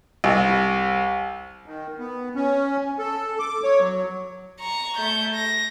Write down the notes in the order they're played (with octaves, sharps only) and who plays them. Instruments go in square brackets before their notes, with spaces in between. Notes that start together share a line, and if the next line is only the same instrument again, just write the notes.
[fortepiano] C2
[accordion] D#3
B3
C#4
A4
D6
C#5
F#3
[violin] A#5 C#6
A3 G6
A#6